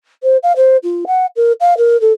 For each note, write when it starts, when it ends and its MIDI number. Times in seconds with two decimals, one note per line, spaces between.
0.23 0.37 72
0.43 0.53 77
0.57 0.77 72
0.83 1.05 65
1.07 1.26 78
1.36 1.53 70
1.61 1.74 77
1.78 1.99 70
2.01 2.12 69